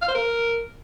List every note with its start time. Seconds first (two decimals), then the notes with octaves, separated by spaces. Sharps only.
0.02 F5
0.08 C5
0.14 A#4